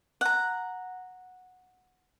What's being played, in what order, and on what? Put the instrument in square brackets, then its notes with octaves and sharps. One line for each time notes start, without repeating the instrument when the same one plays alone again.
[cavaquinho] F#5 A#5